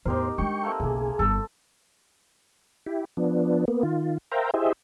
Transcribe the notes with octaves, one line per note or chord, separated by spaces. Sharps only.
E2 A2 D#4 G4 A#4 C5
G#3 D4 G5 C#6
A3 A#3 C4
F#1 B1 G#4
G1 G2 A4
E4 G4
F3 B3 D4
A#3 B3
D#3 F4
A#4 C5 E5 F5 G5 A#5
E4 G4 G#4 C5 D#5 E5